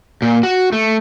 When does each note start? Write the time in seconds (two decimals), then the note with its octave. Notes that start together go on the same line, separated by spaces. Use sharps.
0.22 A#2
0.43 F#4
0.72 A3